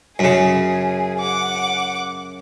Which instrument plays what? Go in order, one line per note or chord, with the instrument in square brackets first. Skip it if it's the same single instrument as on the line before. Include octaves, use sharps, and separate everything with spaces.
[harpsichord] F#2 C#3 [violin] G#4
[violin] F#5 D6